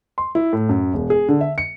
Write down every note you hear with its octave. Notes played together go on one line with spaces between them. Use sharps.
C6
E4
A2
F#2
E1
G#4
D3
E5
C#7